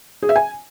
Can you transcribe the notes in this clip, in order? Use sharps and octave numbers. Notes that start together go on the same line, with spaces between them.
G#4
E5
G#5